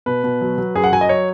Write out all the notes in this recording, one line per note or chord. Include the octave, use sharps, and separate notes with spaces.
B2 B4
B2
F#3
F#3
F#2 G#4
F#5
F#3 G#5
D#5
C#5